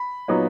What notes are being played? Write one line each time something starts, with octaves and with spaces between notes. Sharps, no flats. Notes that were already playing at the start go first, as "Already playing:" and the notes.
Already playing: B5
A#2 F#3 B3 D#4